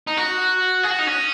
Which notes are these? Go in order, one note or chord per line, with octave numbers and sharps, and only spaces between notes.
D#4
F#4
G#4
F#4
D#4
C#4